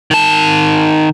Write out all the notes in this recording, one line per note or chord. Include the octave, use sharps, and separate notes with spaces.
D#3 A5